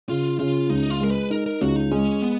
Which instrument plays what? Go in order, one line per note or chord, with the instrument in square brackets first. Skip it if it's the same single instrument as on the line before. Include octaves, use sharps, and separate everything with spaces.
[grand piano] C#3 [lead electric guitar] F4
[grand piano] C#3 [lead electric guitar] F4
[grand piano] C#2 [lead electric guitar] D#4
[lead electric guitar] F4
[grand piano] G#3 [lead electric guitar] A#4
[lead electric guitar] B4
[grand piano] D#4 [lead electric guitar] A#4
[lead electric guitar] A#4
[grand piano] C#2 [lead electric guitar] F#4
[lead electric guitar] D#4
[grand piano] G#3 [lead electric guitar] C#4
[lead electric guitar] B3